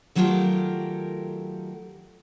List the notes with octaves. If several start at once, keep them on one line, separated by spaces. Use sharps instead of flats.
D#3 F#3 A3 F4 G4 A#4